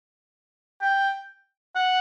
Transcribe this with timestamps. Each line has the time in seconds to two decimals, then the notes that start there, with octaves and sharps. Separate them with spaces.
0.81 G5
1.75 F#5